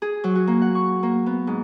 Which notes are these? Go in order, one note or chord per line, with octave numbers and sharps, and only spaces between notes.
G#4
F#3
F#4
A#3
F#5
C#6
A#3
B3
G#2